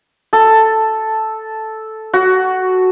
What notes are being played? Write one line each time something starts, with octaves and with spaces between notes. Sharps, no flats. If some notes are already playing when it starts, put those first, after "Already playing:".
A4
F#4